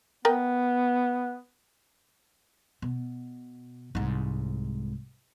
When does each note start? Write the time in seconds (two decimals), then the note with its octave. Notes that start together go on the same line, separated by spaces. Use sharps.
0.25 B3 A#4 D#5 G5
2.82 B2
3.95 C2 G#2